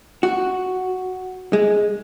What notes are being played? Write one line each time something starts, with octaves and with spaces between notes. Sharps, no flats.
F#4
G#3